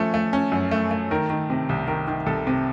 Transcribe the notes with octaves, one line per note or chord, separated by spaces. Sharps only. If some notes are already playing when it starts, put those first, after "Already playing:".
Already playing: F3 A3 C#4 A4
A3
C#4
F#2
A3
A3
D#3 A#4
D#3
C3
C2
D#3 A#4
D#3
C2 A4
C3